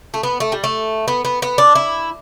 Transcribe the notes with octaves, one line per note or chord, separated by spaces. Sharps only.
A3
B3
A3
G3
A3
B3
B3
B3
D4
E4